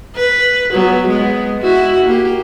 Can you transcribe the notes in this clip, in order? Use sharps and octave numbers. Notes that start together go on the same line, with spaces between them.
B4
F#3 B3
G#3 B3
E4 F#4
A#3 G4